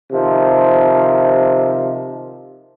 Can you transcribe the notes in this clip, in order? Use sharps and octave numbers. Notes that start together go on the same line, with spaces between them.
C3 D#3 F3